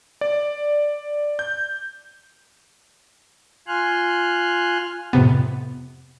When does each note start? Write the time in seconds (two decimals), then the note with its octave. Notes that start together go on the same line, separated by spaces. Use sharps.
0.21 D5
1.39 G6
3.67 F4 G#5 C6 F6 F#6
5.13 F2 A2 C3 B3